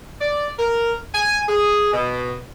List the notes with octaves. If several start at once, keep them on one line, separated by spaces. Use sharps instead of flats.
D5
A#4
G#5
G#4
B2